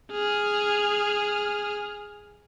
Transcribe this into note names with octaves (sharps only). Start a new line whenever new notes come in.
G#4 F6